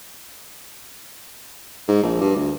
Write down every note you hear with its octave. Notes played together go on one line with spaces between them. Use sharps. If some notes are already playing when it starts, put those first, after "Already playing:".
G#2
A#1
G2
D2